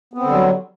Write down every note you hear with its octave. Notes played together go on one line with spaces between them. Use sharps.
D3 F#3 G3 B3 C4